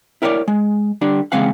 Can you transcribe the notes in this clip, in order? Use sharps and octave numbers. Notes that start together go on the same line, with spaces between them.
E4 A#4 B4 C#5 D5
G#3
D3 G3 D4
E2 C#3 G#3 C4 F5 F#5